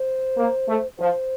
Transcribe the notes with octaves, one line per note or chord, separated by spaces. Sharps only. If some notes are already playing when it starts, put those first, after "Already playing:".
Already playing: C5
A#3
A3
F3 C5